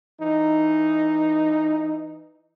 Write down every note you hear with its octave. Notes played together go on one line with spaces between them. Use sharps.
E3 D#4